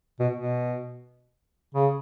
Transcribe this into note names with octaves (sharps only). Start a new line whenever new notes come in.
B2
B2
C#3